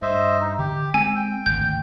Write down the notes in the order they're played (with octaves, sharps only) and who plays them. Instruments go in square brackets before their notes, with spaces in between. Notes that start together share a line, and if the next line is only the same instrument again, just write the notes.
[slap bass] G2 [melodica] C5 D#5 E5
[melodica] D#4
[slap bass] D3 [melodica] G4
[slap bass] G#3 C4 [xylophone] G#5 [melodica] E6
[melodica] G5
[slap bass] G#1 D2 [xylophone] G6